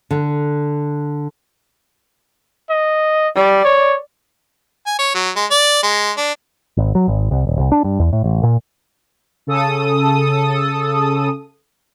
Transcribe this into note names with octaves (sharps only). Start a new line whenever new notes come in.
D3
D#5
G3 D5
C#5
G#5
C#5
F#3
G#3
D5
G#3
D4
G#1
F#3
G#1
C2
D#1
C2
D4
G2
E2
A2
A1
A#2
C#3 A4 D#6